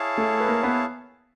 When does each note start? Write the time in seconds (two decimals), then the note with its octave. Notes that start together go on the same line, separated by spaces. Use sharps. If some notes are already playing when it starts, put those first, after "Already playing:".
Already playing: E4 G#4 C#5 F5 A5
0.18 A3 A4
0.40 B4
0.48 A#3 A#4
0.63 B3 B4